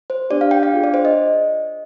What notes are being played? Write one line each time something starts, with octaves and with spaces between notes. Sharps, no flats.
C5
B3 D4 G4 D5
F5
G5
F5
D4 F4 G#4
D5
C5
D#5